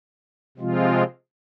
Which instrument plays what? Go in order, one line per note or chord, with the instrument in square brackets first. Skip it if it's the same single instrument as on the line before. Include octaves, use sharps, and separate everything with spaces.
[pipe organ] C3 F3 G#3 C4 F4